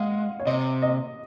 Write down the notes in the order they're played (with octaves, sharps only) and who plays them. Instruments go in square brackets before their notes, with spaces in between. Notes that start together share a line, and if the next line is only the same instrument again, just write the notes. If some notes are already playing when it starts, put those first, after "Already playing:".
Already playing: [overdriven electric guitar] G#3 [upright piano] F5 F#5
[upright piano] C#5
[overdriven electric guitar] C3 [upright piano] D#5
[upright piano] D#5